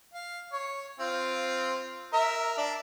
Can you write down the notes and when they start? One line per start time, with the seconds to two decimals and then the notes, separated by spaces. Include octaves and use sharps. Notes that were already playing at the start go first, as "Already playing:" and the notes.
0.14 F5
0.53 C#5
1.00 C4 F4
2.13 A#4 E5
2.58 D4 D5